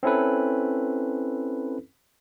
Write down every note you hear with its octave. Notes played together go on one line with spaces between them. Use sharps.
C4 C#4 E4 A4 B4